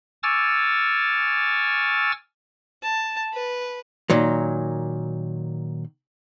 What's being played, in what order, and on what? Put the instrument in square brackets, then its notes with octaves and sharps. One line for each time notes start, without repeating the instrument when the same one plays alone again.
[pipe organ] G#5 C#6 D6 E6 F6 A6
[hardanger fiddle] A5
B4
[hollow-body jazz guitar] A#2 D#3 F#3